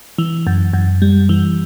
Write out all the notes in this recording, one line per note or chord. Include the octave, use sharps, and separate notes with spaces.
E3
F#2
F#2
G3
E3